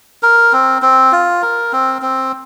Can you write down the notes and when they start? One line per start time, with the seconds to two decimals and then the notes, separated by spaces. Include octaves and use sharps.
0.23 A#4
0.53 C4
0.82 C4
1.12 F4
1.42 A#4
1.73 C4
2.02 C4